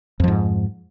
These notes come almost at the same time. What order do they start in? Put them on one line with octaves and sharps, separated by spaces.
F2 F3 G#2